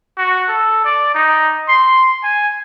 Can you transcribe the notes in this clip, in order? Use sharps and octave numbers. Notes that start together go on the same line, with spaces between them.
F#4
A4
D5
D#4
C6
G#5